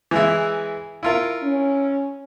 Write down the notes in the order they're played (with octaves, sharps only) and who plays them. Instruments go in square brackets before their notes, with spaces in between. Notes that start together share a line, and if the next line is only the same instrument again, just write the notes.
[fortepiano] E3 G#3 E4
E4 F4 A#4
[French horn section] C#4